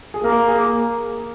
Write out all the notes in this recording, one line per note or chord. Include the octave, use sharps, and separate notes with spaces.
G#4
A#3 A#4
G#4